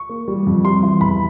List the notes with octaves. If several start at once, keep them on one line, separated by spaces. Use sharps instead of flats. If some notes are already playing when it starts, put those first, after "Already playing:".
Already playing: C#6
A#3
G3
F2
G3 C6
E3
E2 B5